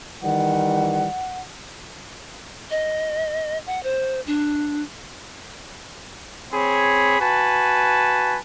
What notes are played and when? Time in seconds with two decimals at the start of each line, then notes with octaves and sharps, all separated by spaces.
0.23 D#3 E3 G3 F#5
2.70 D#5
3.66 F#5
3.83 C5
4.27 D4
6.53 C4 G#4 C#5 B5
7.20 F#4 B4 G#5 A5